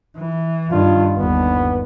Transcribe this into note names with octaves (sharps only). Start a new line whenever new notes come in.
E3
G2 D#3 F4
G1 D#2 B3